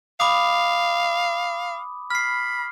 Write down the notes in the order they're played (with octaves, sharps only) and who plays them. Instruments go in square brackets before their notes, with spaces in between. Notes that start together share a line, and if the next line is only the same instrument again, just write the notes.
[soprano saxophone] F5 [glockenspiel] B5 D6 D#6
[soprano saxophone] B5 [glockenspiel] F6 C7